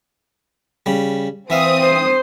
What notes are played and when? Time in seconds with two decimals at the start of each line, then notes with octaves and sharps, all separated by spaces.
0.86 C#3 G3
1.50 E3 C4 E5 F5 D#6
1.82 C5